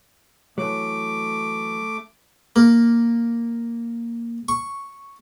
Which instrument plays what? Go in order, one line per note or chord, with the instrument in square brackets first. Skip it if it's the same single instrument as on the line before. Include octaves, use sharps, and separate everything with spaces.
[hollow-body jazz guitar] E3 F#3 [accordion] A3 D6
[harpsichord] A#3
C#6